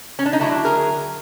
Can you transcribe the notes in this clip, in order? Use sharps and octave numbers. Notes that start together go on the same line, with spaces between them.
C#4
D4
D#4
D3 F#3 A3 D4 E4
G#4 A#4